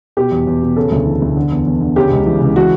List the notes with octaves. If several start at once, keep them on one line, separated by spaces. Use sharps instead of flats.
B2 G4
E2
E2
B2
C#3 A4
D2
E3
D2
D3
E2
E2
D3
C#3 G4
C#2
E3
C#2
E3 F#4